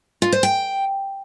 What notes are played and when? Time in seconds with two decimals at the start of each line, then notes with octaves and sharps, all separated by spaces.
0.22 F4
0.32 C5
0.43 G5